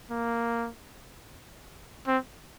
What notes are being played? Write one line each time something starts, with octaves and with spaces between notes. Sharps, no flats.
A#3
C4